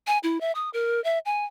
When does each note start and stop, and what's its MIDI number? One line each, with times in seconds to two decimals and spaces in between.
0.07 0.18 80
0.23 0.40 64
0.41 0.52 76
0.55 0.70 87
0.73 1.02 70
1.04 1.19 76
1.26 1.45 80